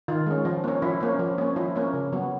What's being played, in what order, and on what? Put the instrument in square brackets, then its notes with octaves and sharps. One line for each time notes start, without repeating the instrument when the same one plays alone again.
[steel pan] D#3 F4
G#3 C#4
F3
A#3 C#4
F3 E4
A#3 C#4
F3
A#3 C#4
F3 E4
A#3 C#4
C#3
F#3 B3